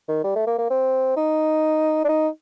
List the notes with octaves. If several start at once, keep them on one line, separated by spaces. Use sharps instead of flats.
D#3
G3
A3
A#3
A#3
C4
D#4
D4
D#4